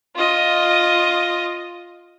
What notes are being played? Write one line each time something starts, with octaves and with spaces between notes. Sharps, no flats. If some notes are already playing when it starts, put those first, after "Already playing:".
F4 D#5